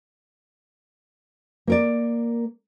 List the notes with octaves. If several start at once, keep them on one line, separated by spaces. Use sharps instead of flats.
A#3 A#4 D5